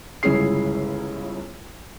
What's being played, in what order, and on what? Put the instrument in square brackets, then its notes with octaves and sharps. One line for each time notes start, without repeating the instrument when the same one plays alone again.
[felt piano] G1 C#2 C#4 E4 G#4 C7